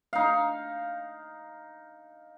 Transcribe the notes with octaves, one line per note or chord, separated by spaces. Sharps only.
D#4 F5